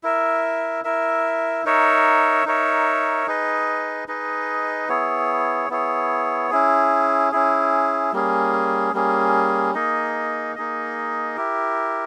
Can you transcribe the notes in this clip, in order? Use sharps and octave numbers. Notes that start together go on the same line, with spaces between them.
E4 A#4 E5
E4 A#4 E5
D#4 A#4 C#5 E5
D#4 A#4 C#5 E5
D#4 G#4 B4 D#5
D#4 G#4 B4 D#5
B3 E4 G#4 C#5
B3 E4 G#4 C#5
C#4 E4 G#4
C#4 E4 G#4
G3 A#3 C#4 G#4
G3 A#3 C#4 G#4
A#3 D#4 G#4 D#5
A#3 D#4 G#4 D#5
E4 G4 A#4